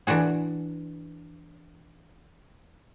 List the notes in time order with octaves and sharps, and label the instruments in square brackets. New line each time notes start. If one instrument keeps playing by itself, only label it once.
[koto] E3 D4 F#4 G#4